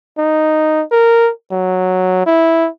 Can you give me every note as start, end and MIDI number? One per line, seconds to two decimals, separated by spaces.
0.18 0.83 63
0.92 1.31 70
1.52 2.24 54
2.27 2.69 64